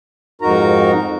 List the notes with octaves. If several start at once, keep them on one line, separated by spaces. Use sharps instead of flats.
F2 G#2 D#4 F#4 A#4 A#5